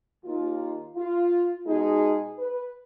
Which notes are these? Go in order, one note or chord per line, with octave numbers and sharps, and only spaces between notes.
D#2 D#3 A#3 D#4 F4
F4
B2 G#3 D#4 G#4
B4